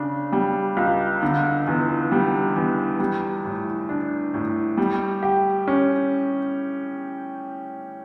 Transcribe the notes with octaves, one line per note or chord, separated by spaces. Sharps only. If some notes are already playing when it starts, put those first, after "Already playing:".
Already playing: C#3 D4
G3
C#2
D3
E2
G3
E2
G3
A2
D4
A2
G3
G4
C#4